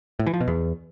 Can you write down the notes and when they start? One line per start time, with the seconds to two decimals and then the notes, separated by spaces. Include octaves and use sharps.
0.19 A2
0.26 E3
0.34 F3
0.41 B2
0.48 E2